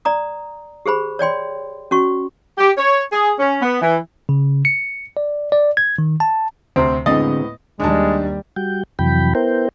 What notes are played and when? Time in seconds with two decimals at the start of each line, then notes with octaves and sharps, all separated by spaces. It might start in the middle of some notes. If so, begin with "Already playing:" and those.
0.05 D5 A#5 D#6
0.86 G4 G#4 C5 B5
1.19 C#5 D5 G5 C6
1.91 C#4 F#4 C#6
2.58 G4
2.77 C#5
3.12 G#4
3.39 C#4
3.61 B3
3.82 E3
4.29 C#3
4.65 C#7
5.17 D5
5.52 D5
5.77 G#6
5.98 D#3
6.20 A5
6.76 D2 C3 C4
7.06 A2 D3 G#3 B3 C4 D#5 A6
7.80 D#2 G3 G#3 D4 D#4 A5
8.56 G3 F#4 G5
8.99 F2 C3 E3 F#3 G5 B5
9.35 B3 E4 A#4 C5 G5